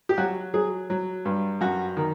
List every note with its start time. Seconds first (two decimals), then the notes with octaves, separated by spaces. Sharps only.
0.09 G4
0.18 F#3 F#4
0.54 F#3 G#4
0.90 F#3
1.25 G2
1.61 F#2 F#4
1.97 D#3